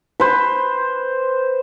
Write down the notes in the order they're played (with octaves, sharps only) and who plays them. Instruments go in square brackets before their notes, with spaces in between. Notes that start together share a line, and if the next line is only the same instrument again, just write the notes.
[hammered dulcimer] B4 C5